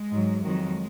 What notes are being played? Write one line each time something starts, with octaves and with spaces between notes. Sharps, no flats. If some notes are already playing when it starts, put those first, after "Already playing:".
Already playing: G#3
G#2 F#3
F2 D#3 F#3 G#3